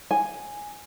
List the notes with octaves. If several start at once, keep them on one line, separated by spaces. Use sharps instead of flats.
G#5